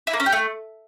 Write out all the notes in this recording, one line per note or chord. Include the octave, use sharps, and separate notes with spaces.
E4
A#3
C#4
G4
A3